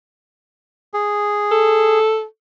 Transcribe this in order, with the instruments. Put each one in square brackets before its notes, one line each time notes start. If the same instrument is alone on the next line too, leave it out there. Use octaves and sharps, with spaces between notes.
[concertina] G#4
[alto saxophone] A4